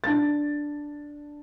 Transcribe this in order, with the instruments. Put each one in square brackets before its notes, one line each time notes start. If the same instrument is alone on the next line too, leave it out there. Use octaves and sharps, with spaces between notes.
[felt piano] D4 A6